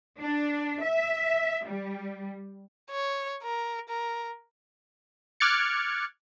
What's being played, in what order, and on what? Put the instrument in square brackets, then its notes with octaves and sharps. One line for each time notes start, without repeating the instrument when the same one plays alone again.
[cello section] D4
E5
G3
[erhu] C#5
A#4
A#4
[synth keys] D6 F6 F#6 G#6 A6 C#7